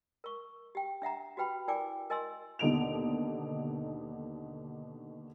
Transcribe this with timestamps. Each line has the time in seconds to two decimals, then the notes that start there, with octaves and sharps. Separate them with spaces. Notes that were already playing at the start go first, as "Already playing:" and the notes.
0.24 A#4 C#6
0.75 G4 G5
1.02 D4 E5 F#5 A#5
1.37 F#4 G4 B4 G5 B5
1.68 E4 A#4 D5 G5 G#5 D6
2.10 A#4 D#5 G#5 C6 E6
2.59 D#2 B2 D3 D#4 D7 F7